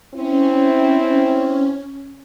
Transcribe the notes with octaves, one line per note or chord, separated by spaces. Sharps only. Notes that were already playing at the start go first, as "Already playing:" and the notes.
C4 C#4 E4